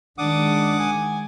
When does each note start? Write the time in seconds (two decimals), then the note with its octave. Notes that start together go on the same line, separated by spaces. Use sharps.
0.18 D#3 G#3 D4 F#5 D6 D#6
0.79 G#5